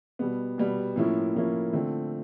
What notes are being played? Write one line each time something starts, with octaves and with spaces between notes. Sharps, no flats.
B2 G3 B3
B2 G3 B3
A2 F3 A#3 C#4 E4
A2 F3 A#3 C#4 E4
D3 F3 A3 C4